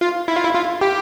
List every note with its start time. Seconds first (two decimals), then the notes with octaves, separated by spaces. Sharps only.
0.01 F4
0.28 E4
0.36 F4
0.44 E4
0.55 F4
0.81 G4